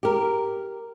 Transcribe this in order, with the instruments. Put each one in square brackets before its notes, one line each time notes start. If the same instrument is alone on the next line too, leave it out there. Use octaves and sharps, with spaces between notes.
[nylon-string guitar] G4 A#4